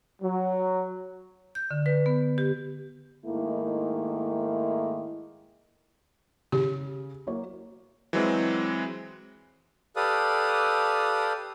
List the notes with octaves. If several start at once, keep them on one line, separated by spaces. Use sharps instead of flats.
F#3
G6
D3
B4
B3
G4
G#2 D#3 A3 A#3 E4
C#3 G4
F#3 A#3 C#5
E3 F#3 G#3 C4
G4 A4 B4 D5 F5 D#6